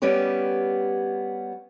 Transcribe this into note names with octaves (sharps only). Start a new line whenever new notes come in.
G3 B3 C#4 G4 C#5